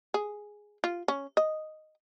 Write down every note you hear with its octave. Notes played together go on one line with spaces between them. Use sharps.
G#4
F4
C#4
D#5